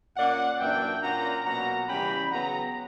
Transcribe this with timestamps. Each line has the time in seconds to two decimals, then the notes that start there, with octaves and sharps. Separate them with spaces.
0.17 A#2 A#3 C#4 D5 F#5
0.60 F#2 E3 A#3 D4 E5 G5
1.03 A#2 A#3 C#4 F#5 A#5
1.45 B2 F#3 A#3 F#5 A#5
1.89 C#3 E3 G3 C#4 G5 B5
2.31 C#3 F#3 B3 F#5 A#5